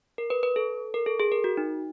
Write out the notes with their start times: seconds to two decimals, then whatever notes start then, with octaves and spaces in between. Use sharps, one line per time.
0.18 A#4
0.30 B4
0.43 B4
0.56 A4
0.94 A#4
1.06 A4
1.20 G#4
1.32 A#4
1.44 F#4
1.57 D#4